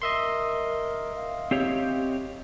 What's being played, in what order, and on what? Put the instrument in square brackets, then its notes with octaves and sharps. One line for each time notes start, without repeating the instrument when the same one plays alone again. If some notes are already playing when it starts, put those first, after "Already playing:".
[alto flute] A#4 [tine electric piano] D#5 E5 C6
[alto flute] F5
[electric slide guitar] C4 G4 C#5